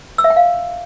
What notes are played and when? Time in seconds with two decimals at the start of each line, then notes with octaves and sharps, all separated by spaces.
0.18 E6
0.24 E5
0.30 G5
0.36 F5